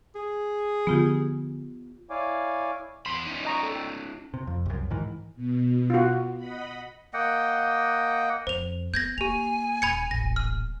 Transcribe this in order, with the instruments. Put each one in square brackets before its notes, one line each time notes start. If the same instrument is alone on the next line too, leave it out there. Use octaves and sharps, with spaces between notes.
[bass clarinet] G#4
[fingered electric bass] D3 F3 [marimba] B3 F4 G4
[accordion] E4 C#5 D5 F5 G#5 D6
[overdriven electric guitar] E2 B5 [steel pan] C6
[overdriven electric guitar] C#4 D#4
[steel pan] D#5 A#5 C#6
A4
G5
[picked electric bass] C3
F2
C2 F#2
G#2 D#3 E3
[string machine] B2
[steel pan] F4 F#4
[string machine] D#5 F#5 B5
[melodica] A#3 D#5 F#5 G5
[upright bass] F2 [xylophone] C5 F7
[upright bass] B3 [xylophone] G6 G#6 A#6
[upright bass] A#3 [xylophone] G4 F7 [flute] G#5
[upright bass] D#1 [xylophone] B5 G#6 C#7
[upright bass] D#1 A1 [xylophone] A#6
[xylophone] F6